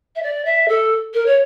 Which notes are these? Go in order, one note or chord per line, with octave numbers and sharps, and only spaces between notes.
E5
D5
E5
A4
A#4
C#5